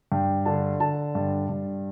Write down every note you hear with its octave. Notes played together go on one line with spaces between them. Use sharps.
G2 G5
D3 A5
D3 A5
G2
G2